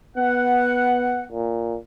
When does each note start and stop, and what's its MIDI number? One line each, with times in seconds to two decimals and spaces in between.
0.17 1.25 59
0.17 1.24 78
1.32 1.77 46